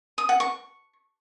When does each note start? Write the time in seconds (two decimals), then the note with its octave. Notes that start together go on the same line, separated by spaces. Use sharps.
0.18 D#6
0.29 F#5
0.40 C#6